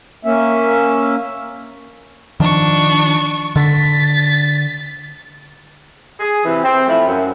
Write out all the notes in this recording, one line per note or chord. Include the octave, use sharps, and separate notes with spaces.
A#3 C#4 E5
D#3 F3 D4 C#6
D3 A6 B6
G#4
C3 E3
C4
F3 A3 E4
F#2